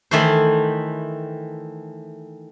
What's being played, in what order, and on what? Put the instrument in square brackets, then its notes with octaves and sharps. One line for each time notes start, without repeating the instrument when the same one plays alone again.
[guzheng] D#3 E3 A3 E4 C5